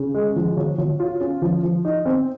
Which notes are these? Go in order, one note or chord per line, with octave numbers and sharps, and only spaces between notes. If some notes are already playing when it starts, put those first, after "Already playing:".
Already playing: C#3
G#3
F3
F#3
F#3
F4
C#4
F3
F3
D#4
C4